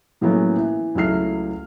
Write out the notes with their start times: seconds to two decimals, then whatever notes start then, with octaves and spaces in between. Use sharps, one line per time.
0.21 A2 E3 F#3 A#3 B3 C#4
0.57 E3
0.95 C#2 F#3 A3 E4 F6 C7